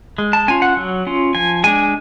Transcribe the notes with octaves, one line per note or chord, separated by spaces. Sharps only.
G#3
A5
C#4 F4 G#5
F#5
F#3
C#4 F4
F3 G#5
G#3 D4 G#5